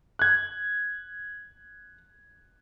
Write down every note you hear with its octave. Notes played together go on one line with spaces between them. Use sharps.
F#6 G#6